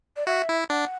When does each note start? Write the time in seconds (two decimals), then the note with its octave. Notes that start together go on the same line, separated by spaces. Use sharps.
0.17 D5
0.27 F#4 E5
0.49 E4
0.70 D4 F#5